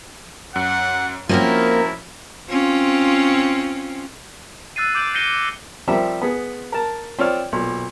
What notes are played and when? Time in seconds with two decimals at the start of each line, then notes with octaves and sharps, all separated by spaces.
0.56 F#2 F#5
1.29 F3 A#3 C4 C#4 E4 F#4 A#4
2.49 C4 C#4 F4
4.76 E6 F#6 A6 C7 D#7
4.95 D6 G6 D7 F#7
5.14 G6 A#6 C7 C#7 D#7 G7
5.88 F3 G3 C4 A#4 E5
6.21 B3 G#4
6.72 A#4 A5
7.19 C4 F4 C#5 D5 F6
7.52 B1 A#2